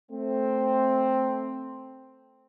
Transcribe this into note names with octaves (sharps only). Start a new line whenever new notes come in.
A3 C4